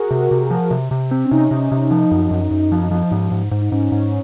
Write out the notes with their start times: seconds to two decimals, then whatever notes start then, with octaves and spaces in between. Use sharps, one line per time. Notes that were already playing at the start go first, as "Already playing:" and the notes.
Already playing: F#4 G#4 A#4
0.11 C3
0.31 C3
0.50 F3
0.71 C3
0.91 C3
1.11 C4
1.25 C#4
1.31 C3 D#4
1.51 C3
1.61 D#4
1.72 C3
1.91 F3 D#4
2.11 F#2
2.31 F#2
2.51 F#2
2.72 F3
2.91 F3
3.11 G#2
3.32 G#2
3.51 G#2
3.61 D#4
3.71 G#2 C#4
3.92 G#2 C#4